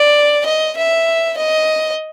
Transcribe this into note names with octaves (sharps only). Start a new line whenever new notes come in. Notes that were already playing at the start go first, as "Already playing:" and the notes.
Already playing: D5
D#5
E5
D#5